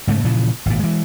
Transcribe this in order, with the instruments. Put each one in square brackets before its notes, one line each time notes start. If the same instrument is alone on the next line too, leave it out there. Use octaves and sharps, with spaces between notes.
[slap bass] G#2 C#3 A3
A#2 C#3 E3 F3
G#1 A#2
E3 G#3